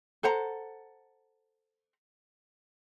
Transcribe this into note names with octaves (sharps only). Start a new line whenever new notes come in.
A4 C5 F#5 A#5